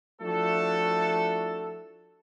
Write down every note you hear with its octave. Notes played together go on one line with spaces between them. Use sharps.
F3 A3 D4 E4 F#4 A4